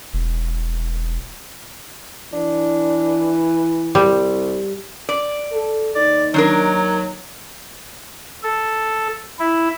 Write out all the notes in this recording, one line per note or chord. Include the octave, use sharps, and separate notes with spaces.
E1
E3 D4
C2 G3
D5
A4
D#2 D#4 D5
D#3 F#3 D4 A#4
A4
E4